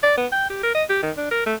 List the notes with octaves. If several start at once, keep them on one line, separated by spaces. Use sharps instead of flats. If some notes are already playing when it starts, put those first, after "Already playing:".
D5
B3
G5
G4
A#4
D#5
G4
D#3
D4
A#4
A3